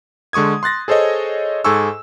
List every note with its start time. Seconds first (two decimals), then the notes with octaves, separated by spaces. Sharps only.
0.33 D3 G#3 C#6 D#6 G#6
0.63 C6 F#6 A6 A#6
0.88 G#4 A4 C5 C#5 D#5
1.64 G#2 G#4 A4 G#5 C#6 E6